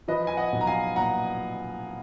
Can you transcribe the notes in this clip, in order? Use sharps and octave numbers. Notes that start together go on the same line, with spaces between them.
F3 B4 D#5
G#5
D#5 F#5
B1
A#5
F5 G#5
A#2 F#5 A#5